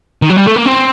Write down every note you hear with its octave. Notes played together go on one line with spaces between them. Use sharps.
D#3
F#3
G3
A3
A#3
C4